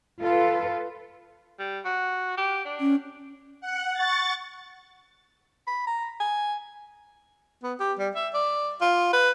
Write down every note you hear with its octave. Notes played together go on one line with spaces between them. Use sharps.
F4 A4 B4
G3
F#4
G4
D4
C#4
F#5
C#6 A6
B5
A#5
G#5
B3
G4
G3
E5
D5
F4
B4